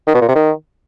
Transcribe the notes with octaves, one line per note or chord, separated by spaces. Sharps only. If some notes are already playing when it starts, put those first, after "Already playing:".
D#3
B2
A#2
C3
D#3